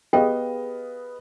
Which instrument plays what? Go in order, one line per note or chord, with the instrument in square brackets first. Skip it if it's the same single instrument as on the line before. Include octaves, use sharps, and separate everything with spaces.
[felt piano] B3 D#5 F5 [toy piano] G4 G#4 G5